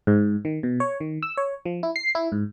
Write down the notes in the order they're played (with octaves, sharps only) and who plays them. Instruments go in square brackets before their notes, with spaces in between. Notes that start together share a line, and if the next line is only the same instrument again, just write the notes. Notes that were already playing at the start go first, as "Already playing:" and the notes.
[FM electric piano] G#2
D#3
B2
C#5
D#3
E6
C#5
F3
E4
C7
E4
G#2